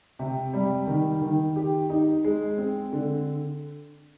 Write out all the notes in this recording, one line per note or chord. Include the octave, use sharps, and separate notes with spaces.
C3
G3
D#3
D#3
G4
D#4
G#3
C4
D3